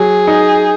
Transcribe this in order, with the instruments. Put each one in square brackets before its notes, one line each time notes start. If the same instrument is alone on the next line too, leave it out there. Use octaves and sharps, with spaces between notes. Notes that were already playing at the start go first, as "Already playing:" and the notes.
Already playing: [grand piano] F#3 [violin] G#4
[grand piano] D#4